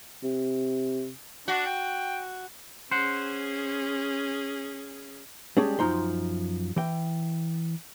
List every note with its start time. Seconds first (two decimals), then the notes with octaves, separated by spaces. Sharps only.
0.23 C3
1.48 D4 F#4
1.66 G5
2.91 C#4 G#4 C5 F#5
5.57 G3 G#3 C#4 D4 G#4
5.79 F#2 F3 D#4 A#5 C6
6.76 E3 G5